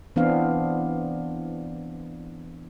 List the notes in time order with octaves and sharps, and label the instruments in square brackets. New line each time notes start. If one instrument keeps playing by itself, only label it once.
[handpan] E3 B3 C4 D4 F5